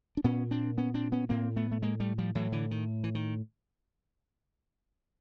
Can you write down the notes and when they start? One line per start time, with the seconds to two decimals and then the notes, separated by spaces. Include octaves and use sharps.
0.17 D4
0.24 A#2 B3 C#4
0.51 C4 D4
0.78 B3 C#4
0.94 C4 D4
1.12 B3 C#4
1.29 A2 A#3 C4
1.56 A3 B3
1.71 A3
1.82 G#3 A#3
2.00 G3 A3
2.18 F3 G3
2.35 A2 E3 F#3
2.52 D3 E3
2.71 D#3
3.04 E3
3.15 D#3